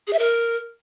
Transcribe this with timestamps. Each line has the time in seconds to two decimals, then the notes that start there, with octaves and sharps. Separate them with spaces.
0.07 G#4
0.13 E5
0.18 A#4